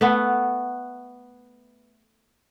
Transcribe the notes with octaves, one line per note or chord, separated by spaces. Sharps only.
A3 B3